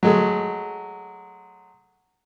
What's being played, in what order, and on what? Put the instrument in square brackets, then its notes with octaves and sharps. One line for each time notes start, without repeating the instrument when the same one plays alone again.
[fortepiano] F#3 G#3 A3